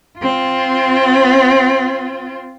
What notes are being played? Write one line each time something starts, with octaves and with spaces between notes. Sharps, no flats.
C4 F4